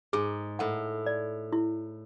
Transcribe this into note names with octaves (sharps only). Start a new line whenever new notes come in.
G#2 G#4
A2 F#5
D5
E4